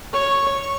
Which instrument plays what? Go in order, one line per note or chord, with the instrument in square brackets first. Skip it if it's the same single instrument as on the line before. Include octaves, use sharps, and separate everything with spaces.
[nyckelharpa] C#5 [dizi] C#6